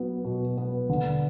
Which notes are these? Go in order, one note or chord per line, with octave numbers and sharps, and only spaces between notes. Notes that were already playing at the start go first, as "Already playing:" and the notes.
Already playing: F#3 B3
B2
B3
D3